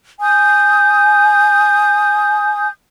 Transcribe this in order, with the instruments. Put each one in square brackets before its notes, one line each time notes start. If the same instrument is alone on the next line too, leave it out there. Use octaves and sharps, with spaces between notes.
[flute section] G#5 D#6 G6